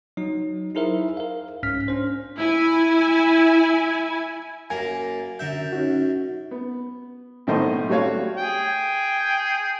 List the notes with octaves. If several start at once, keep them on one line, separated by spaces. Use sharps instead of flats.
F#3 D#4
D#4 E4 G#4 A#4 C5 E5
A#4 F5
C2 G#2 C#4 F6 B6
C#4 D4 C5
E4 G#5
F#2 A#3 G#5
F#2 D3 E5 G6
C#4 D#4 F#4
B3
B1 A2 D#3 A3 C5 D#5
G3 A3 F#4 C#5 F5
G#4 G5